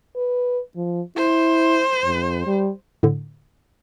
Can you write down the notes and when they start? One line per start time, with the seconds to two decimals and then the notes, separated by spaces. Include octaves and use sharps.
0.16 B4
0.76 F3
1.17 E4 C5
2.04 F2
2.47 G3
3.03 A2 D3